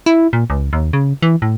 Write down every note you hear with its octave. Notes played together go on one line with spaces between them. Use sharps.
E4
A#2
C#2
D#2
C#3
E3
A2